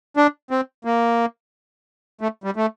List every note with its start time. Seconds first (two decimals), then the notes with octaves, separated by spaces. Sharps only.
0.17 D4
0.51 C4
0.85 A#3
2.21 A3
2.44 G3
2.56 A3